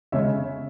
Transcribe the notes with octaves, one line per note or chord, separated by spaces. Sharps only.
C#3 G#3 C#5 E5